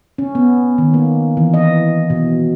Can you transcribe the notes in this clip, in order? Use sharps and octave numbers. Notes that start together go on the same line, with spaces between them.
C#4
B3
D#3
A#3
E3
D#5
B2